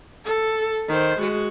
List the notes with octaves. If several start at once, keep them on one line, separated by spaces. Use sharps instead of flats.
A4
D#3 C5
G#3 F#4